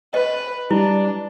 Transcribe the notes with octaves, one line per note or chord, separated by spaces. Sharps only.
B4 D#5
G3 D4 E4